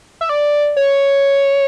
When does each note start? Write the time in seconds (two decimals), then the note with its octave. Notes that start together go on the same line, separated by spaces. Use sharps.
0.21 E5
0.29 D5
0.77 C#5